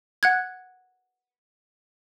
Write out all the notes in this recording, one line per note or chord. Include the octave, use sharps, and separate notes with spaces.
F#5 F#6 G#6